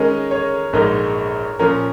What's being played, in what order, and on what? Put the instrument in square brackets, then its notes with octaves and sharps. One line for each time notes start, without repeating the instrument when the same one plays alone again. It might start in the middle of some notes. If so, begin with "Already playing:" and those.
Already playing: [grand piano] D#3 G#3 C#4 G#4 D#5 [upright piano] A#4
[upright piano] C#5
[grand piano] A#1 G#2 G#3 D#4 [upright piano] A#4
[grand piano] A#2 F3 C#4 [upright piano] A#4